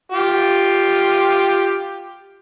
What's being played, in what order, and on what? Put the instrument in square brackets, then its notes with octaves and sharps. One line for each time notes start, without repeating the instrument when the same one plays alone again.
[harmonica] F4 G4